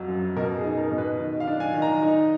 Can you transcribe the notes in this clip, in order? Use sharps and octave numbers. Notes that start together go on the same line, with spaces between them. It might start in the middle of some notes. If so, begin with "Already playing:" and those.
Already playing: F2 F#3
F#2
B2 A#4
G#4
D#4
A#4
B2
B4
D#3
F5
D4
G#5
D#3
A#5
D#4